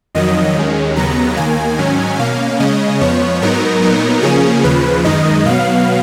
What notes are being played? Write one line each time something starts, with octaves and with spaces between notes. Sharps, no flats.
F2 D#3 F#3 D#5
D#2 D#3 G#3 C#4
D#2 C#3 F#3 B3 A#5
D#2 D#3 A#3 G#5
G#2 D#3 F#3 C#4
B2 A#3 C#4 F5
C#3 G#3 C#4 D#5
F2 F3 B3 C#5
G#2 F#3 B3 D#4 A#4
A#2 F#3 B3 D#4
C#3 F3 A#3 C#4 G#4
D#2 C#3 F3 B4
F#2 D#3 G#3 D#4 D#5
B2 F#3 B3 F5